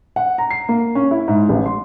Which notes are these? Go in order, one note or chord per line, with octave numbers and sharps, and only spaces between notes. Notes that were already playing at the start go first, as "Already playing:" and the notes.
F#5
A#5
C7
A#3
C#4
E4
G#2
A1
C6